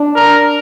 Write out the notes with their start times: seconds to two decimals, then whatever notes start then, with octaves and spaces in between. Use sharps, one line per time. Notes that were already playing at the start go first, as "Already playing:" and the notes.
Already playing: D4
0.16 A#4